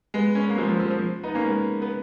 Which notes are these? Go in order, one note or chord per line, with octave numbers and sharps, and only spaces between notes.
G#3 B3
C#4
B3
A#3
F3 G#3
F3
F3
F3
B3 D#4
A#3 C#4
G#3 B3
B3